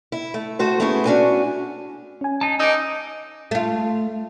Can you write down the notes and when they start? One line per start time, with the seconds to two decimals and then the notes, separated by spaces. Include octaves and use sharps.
0.12 E4
0.34 A3
0.59 A3 F#4 C5
0.80 A3 B3 C#4 E4 G#4
1.05 C#4 D4 F#4 G#5
2.21 C#4 G#5
2.41 D#4 A5
2.59 D#4 D6 E6
3.51 A3 F4